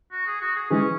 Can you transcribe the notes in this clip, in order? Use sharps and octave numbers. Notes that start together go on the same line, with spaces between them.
F#4
G#4
F#4
G#4
E3 G#3 C#4